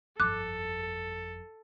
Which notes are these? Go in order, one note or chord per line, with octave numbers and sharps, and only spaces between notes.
G1 F2 A4 D6 F#6